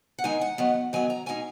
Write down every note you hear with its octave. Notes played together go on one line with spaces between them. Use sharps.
F#5
D#3 G#3 D#4 G#5
F#5
D#3 F#3 B3
D#3 F#3 B3 G#5
A#5
B2 G#3 D#4 G#5